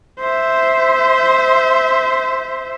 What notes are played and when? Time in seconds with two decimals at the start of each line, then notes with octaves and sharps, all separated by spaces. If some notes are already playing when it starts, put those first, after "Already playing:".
0.20 C5 E5